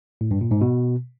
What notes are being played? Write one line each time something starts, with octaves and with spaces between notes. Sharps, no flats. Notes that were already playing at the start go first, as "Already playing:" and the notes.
A2
G2
A#2
G#2
B2